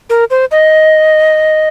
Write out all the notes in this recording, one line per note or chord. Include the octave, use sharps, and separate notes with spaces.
A#4
C5
D#5